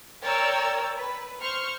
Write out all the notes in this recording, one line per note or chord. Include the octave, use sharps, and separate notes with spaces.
A#4 C#5 D5 G5 A#5 E6
B4
C5 C#6 F6